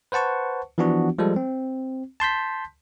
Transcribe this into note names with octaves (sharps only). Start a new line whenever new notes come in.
B4 C5 F#5 A5 C#6
E3 F3 B3 D4 F#4
F3 G3 G#3 A4
C4
A5 C6 G6 B6